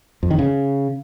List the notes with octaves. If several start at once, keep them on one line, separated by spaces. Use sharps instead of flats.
F2
D#3
C#3